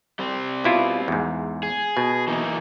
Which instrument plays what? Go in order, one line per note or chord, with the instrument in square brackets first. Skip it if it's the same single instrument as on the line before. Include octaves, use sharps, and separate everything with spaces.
[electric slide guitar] G3 C4
[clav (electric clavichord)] B2 E4 F4
E2 G#2
[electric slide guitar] G#4
[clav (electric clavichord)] B2
[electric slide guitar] E3 A#3 D#4